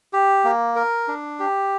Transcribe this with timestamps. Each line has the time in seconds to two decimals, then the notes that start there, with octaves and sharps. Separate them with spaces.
0.13 G4
0.44 A#3
0.76 A#4
1.08 D4
1.39 G4